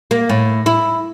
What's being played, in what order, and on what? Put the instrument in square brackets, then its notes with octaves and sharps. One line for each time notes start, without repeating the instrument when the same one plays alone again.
[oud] A#3
A2
E4